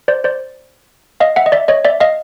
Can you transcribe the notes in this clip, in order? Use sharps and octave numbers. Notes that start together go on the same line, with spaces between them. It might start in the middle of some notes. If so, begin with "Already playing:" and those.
C5 D5
C5 D5
D#5 F5
E5 F#5
D#5
D5 E5
C#5 D#5
D5 E5
D#5 F5